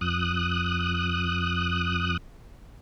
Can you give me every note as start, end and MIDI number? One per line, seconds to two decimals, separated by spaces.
0.01 2.17 41
0.01 2.17 87
0.01 2.17 90